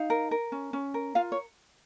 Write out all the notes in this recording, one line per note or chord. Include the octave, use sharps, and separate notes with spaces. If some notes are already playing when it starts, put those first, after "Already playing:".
Already playing: D#4 F5
A#4
A#4
C#4
C#4
A#4
F4 F5
C#5